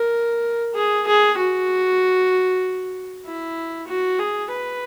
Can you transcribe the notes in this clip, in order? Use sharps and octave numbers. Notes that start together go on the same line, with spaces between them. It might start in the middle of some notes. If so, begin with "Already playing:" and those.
Already playing: A#4
G#4
G#4
F#4
E4
F#4
G#4
B4